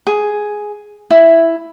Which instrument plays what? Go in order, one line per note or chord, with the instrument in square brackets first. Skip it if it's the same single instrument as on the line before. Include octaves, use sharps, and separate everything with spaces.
[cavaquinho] G#4
E4